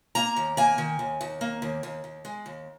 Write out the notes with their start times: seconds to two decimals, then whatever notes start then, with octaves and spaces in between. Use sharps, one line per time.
0.15 A#3 A#5
0.36 D#2
0.57 A#3 G#5
0.78 D#3
0.99 D#2
1.21 D#2
1.41 A#3
1.62 D#2
1.83 D#2
2.04 D#2
2.25 G#3
2.46 D#2